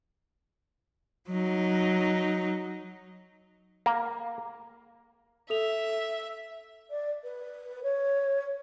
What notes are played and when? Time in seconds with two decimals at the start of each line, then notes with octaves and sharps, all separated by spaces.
1.29 F#3 D#4
3.86 A#3
5.50 A4 E5 F7
6.90 D5
7.24 B4
7.83 C#5